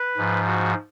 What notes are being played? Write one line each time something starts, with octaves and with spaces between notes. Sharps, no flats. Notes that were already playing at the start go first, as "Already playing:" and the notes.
Already playing: B4
G#2 F3
F#4